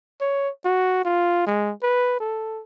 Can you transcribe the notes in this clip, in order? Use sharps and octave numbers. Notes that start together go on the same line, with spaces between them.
C#5
F#4
F4
G#3
B4
A4